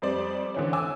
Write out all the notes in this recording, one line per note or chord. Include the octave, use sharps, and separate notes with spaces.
F2 G3 C5 D5
D3 E3 C#4
G#5 D6 E6